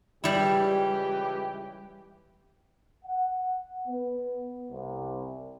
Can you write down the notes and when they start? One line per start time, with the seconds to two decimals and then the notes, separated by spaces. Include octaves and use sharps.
0.24 C#2 E3 G3 E4 G4
3.05 F#5
3.87 B3
4.70 C2